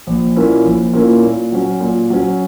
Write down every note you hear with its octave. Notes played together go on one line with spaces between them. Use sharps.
A#1
A#2 A#3 C#4 E4
A#1
A#2 A#3 C#4 E4
A#2
F#3 C#4
A#2
F#3 C#4